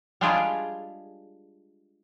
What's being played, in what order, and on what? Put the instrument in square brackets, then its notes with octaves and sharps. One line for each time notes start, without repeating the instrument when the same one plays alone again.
[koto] G3 G#3 D4 F4 G4 G#4